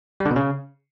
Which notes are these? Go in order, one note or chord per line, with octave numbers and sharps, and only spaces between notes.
G3
D3
B2
C#3